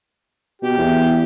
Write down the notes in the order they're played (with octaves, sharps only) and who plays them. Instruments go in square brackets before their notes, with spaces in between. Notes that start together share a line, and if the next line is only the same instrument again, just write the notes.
[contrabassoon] B2 [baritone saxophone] G4
[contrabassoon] E2